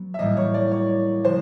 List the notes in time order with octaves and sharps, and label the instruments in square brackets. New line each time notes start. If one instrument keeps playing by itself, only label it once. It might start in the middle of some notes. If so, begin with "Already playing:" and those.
Already playing: [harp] F#3 B3
[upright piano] E5
[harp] A2 E3 G3 A#3 [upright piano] D#5
[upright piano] C#5
D5
C#5
[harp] C#3 F3 G#3 [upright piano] C5